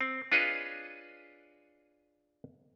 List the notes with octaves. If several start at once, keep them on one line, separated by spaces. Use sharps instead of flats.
C4
D4 F4 G#4 B4 C#5 D#5